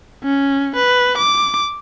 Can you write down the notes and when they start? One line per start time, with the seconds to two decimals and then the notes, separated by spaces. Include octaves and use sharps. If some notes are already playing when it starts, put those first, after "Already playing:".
0.24 C#4
0.76 B4
1.18 D6